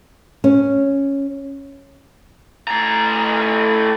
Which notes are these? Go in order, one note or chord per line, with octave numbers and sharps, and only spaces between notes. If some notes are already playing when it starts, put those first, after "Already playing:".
C#4
A2 A#5